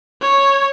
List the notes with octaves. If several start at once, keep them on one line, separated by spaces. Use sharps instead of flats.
C#5